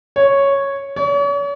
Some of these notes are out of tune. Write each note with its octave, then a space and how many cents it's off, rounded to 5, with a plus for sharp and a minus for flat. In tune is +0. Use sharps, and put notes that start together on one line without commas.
C#5 -5
C#5 +40